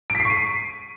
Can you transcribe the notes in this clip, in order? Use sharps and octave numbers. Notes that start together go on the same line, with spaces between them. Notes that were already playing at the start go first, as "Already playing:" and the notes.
D7
B6
C7
C#6
D#7